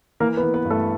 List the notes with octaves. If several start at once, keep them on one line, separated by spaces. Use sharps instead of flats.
E3 A#3 A#4
B3 B4
E3
B3 B4
G2
A3 A4